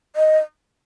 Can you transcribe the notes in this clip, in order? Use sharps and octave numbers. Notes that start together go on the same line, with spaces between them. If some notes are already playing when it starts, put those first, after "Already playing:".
D#5